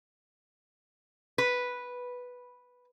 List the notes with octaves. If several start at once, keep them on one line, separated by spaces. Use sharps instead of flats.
B4